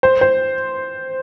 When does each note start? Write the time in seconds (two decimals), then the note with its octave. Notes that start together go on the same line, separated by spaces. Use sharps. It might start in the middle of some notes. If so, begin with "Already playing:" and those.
0.03 C5
0.21 C5